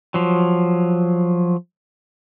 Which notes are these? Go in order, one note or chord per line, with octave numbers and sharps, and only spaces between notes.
F3 F#3